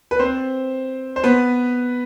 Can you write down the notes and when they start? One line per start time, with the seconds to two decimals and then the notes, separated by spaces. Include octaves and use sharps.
0.11 B4
0.19 C4 C5
1.16 C5
1.24 B3 B4